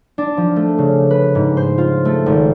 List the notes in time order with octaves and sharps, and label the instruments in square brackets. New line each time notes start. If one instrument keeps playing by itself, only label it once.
[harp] D4
F3
A3
C#3
B4
G#2
C5
F4
A3
G#1